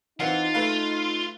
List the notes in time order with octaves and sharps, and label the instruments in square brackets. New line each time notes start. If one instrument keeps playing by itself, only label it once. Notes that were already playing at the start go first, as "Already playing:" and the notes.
[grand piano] E3 C4 F#5 [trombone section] D#4 [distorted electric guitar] F4
[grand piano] A3 B4 F5